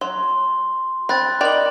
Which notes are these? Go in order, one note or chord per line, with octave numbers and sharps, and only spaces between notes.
F#3 C6
C4 B5 F#6 A6
D#3 D#4 D5 B5 F#7